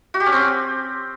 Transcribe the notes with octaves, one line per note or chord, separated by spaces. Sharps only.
F#4
G4
C#4
C4